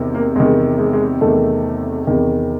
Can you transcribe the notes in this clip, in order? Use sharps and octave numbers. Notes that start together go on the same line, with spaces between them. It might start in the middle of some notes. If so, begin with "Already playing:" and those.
Already playing: E2 C3 D#3
A#3
E2 C3 D#3 G#3
G#3
G#3
E2 C3 D#3 A3
E2 C3 D#3